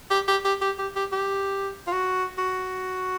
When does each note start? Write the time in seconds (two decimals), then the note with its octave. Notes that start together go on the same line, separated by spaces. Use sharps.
0.11 G4
0.28 G4
0.45 G4
0.62 G4
0.79 G4
0.96 G4
1.12 G4
1.87 F4
1.93 F#4
2.38 F#4